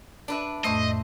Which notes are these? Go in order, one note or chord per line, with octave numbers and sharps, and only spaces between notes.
D4 B4 E5
F2 A2 A3 C5 D#5 E5